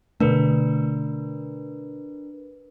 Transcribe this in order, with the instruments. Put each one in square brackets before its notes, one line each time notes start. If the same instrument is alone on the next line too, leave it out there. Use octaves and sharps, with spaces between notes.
[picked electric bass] B2 D3 A3 [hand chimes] D4 A#4 B4